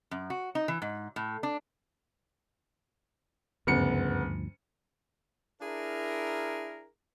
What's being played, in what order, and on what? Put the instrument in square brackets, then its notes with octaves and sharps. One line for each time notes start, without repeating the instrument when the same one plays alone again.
[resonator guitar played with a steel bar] F#2
F#4
D#4
E3
G#2
A2
D4
[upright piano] F#1 B3 C#7 [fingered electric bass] D2 G2 F3
[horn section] D4 E4 G#4 A#4